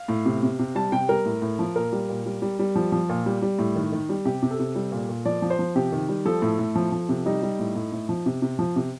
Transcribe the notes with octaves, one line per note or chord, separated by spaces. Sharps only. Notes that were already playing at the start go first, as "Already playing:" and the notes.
Already playing: F5
A2
C3
C3
C3
G3 A5
C3 G5
G3 A#4
A2
A2
F3
A#2 A#4
G3
A#2
G3
G3
G3
F3
F3
A#2
G3
G3
A2
D#3
D#3
G3
C3 G4
C3
A4
C3
G3
A#2
A#2
F3 D5
F3
C5
F3
C3 G4
D#3
G3
F3 A4
A2
A2
F3
F3
C3
G3 D#4
G3
A2
A2
A2
F3
C3
C3
F3
C3